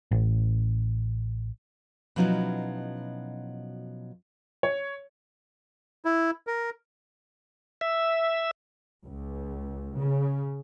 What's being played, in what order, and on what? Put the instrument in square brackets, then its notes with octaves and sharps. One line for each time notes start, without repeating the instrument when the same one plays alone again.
[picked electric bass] A1
[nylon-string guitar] B2 F3 F#3 C#4 D#4 E4
[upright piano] C#5
[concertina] E4
A#4
[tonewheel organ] E5
[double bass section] C#2
C#3